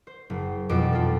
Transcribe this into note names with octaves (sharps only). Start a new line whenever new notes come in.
C5
F#1
F1 F2 B2 E3 C6 D6
F4 A4